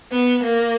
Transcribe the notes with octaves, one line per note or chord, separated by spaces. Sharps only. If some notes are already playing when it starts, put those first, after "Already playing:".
B3
A#3